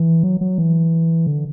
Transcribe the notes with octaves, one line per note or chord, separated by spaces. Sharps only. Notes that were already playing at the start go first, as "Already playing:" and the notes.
Already playing: E3
F#3
F#3
E3
D3